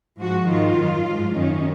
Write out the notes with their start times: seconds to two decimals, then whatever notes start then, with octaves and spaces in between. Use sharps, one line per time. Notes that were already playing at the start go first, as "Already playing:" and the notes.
0.19 G#2 F3 F#4
0.48 G#2 D#3 F4
0.76 F#2 D#3
1.05 G#2 F3
1.33 F#2 D#3 C#4